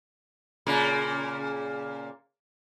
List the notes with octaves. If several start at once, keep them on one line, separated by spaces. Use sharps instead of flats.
A#2 C#3 A#3